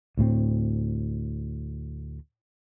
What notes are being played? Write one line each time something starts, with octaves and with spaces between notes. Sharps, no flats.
D2 A2 G#3 C4